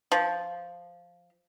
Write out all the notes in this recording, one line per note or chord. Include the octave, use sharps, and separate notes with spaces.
F3